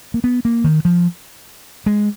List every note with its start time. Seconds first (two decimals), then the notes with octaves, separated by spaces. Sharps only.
0.14 A#3
0.24 B3
0.45 A#3
0.64 D#3
0.85 F3
1.86 G#3